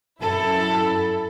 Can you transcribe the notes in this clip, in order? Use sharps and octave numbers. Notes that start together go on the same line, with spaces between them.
F#2 E4 A4